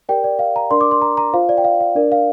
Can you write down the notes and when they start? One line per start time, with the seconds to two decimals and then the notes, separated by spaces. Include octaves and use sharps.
0.09 G4 A#4 D5 G5
0.24 D5
0.39 F5
0.56 A#5
0.71 D4 A#4 D5 C6
0.81 D6
0.91 C6
1.02 A#5
1.17 A#5
1.33 F4 C5 F5
1.49 D5
1.58 G5
1.64 F5
1.80 F5
1.95 D4 A#4 D5
2.12 F5